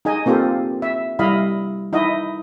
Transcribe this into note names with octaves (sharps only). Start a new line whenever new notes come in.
D#4 G#4 D#5 G#5
A#3 C4 F4 G4 A4
E5
G3 E4 D#5 F5 B5
D#4 E4 D#5